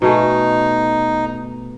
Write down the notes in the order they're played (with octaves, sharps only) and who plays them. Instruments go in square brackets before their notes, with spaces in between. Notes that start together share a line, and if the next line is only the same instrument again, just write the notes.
[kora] B2 A3 G#4 [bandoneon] D#4